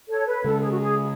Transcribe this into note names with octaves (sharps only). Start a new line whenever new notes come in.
A4 C#5
B4
C#3 G#3 C#4 A4
G#4
F#4
G#4